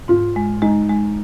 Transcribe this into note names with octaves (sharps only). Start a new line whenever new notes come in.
G#2 F4
G#3
G#3 D#4
G#3